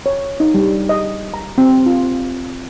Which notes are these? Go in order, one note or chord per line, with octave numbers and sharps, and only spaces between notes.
C#5
D#4
G3
D#5
A#5
C4
F4